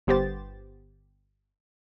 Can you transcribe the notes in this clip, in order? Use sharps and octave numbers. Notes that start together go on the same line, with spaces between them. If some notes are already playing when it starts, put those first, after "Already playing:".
G1 B3 G4 C5 A6